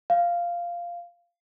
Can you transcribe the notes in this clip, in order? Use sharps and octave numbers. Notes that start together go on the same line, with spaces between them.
F5